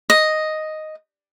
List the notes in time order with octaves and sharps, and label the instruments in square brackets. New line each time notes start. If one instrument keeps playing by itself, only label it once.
[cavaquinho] D#5